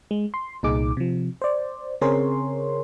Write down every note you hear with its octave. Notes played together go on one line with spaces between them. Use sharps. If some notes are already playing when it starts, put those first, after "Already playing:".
G#3
C6
C2 A#2 D#4 G#4 D6
C3 F3
C5 D5
C#3 C4 G#4 A#4 C#5 C6